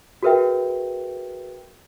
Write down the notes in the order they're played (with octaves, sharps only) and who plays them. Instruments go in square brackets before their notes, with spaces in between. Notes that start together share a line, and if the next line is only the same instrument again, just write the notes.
[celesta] F#4 G#4 A#4 B4 E5 G5